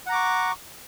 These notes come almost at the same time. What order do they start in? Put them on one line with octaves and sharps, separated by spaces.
F#5 A#5 D6 C#6